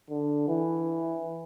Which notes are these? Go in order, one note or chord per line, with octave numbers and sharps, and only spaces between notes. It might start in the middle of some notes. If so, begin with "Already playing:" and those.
D3
E3